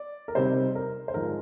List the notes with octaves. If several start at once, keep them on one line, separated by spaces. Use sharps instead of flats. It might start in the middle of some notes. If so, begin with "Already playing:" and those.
Already playing: D5
A#4
C3 G3 C4 D#4 C5
A#4
C5
G#2 F3 G#3 A#4